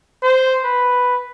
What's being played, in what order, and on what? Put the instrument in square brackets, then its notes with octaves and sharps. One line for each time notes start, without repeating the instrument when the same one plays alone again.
[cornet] C5
B4